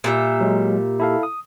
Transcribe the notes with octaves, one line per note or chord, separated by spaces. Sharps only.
A#2 G3 E5
F#3 G#3
E4 A4 F5
D#6